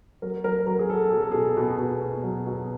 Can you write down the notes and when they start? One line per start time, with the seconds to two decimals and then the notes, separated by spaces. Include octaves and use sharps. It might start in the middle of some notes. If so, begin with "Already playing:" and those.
0.22 F#3 A#4
0.44 F#3 A#4
0.67 F#3 A#4
0.79 G#4
0.90 F#3 A4
1.12 B2 G#4
1.22 A4
1.32 B2 G#4
1.57 B2
1.79 B2
2.01 B2
2.24 F#3
2.47 B2